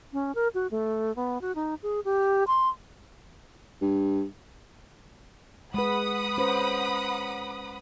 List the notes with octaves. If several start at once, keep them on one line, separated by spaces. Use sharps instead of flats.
C#4
A#4
F#4
A3
B3
F#4
D#4
G#4
G4
C6
G2
G#3 B4 F#5 B5 D#6
C#4 B4 C5